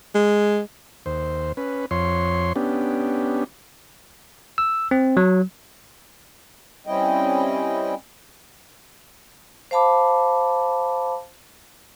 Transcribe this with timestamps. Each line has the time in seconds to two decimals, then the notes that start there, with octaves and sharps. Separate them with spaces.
0.14 G#3
1.06 D#2 C5
1.57 C#4 B4
1.91 F2 C#5 C6
2.56 B3 C#4 D4 G4
4.58 E6
4.91 C4
5.17 F#3
6.87 G3 C4 C#4 E4 D#5 G5
9.71 C5 F5 A5 B5 D6